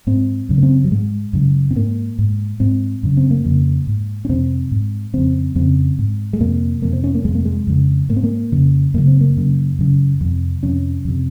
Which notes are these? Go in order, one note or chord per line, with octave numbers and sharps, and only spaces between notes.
G#2 C4
F#2 C#3
A#3
C4
F#3
G#2 G#3
F#2 C#3
C4
G#2 A#3
G#2
G#2 C4
F#2 C#3
C4
A#3
F2 C#3
G#2
C#4
F2 C3 C4
G#2
F2 C#3 C4
F2 C#3 C4
G#2
G#3
F2 C3 A#3
F2 C3 A#3
C4
C#4
A#3
F2 C3 G#3
A#3
G#3
F2 C#3
G#2 A#3
C4
A#3
F2 C#3
F#2 C#3 A#3
C4
A#3
F#2 C#3
F#2 C#3
F2 C3
F2 C3 C#4
F2 C3